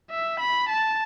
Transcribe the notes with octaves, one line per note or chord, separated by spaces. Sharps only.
E5
B5
A5